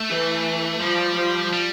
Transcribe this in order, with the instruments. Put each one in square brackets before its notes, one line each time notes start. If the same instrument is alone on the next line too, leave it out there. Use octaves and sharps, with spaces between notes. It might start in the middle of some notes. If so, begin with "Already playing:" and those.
Already playing: [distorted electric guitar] A3
[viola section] E3
[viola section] F3 [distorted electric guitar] G3
[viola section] F3
[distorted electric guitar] G3